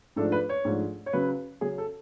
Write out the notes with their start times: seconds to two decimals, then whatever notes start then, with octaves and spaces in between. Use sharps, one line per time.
0.16 G#2 F3 A3 D4 A4
0.32 B4
0.49 C#5
0.65 G#2 F3 A3 D4
1.06 C#5
1.13 C#3 F#3 C#4 B4
1.61 C#3 F#3 C#4 G#4
1.78 A4